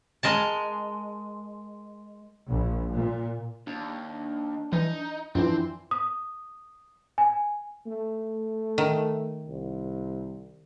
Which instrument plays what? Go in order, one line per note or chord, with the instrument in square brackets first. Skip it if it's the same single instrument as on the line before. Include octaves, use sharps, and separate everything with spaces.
[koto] G#3 A#4 A5
[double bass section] A#1
A#2
[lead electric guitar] D#2 [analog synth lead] D4
[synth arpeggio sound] E3 [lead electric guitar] D#4
[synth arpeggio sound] F#2 [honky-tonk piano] E3 F3 [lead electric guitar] C4 C5 [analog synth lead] D4
[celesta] D#6
G#5
[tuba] A3
[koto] D#3
[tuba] C2